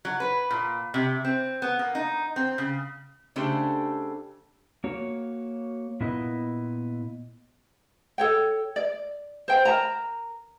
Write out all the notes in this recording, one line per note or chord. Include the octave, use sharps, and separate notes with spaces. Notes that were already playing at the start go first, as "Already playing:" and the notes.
F#3
B4
A#2
C3
C4
B3
A#3
D#4
C4
C#3
C#3 A3 D4 G4 A4 C5
A#3 F#4 C#5
A#2 B3 E4 D#5
A4 C#5 G5
D5
C5 G5
A#4 A5 A#5